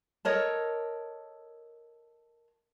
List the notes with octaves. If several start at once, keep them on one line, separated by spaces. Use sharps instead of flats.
A4 A#4 C#5 D#5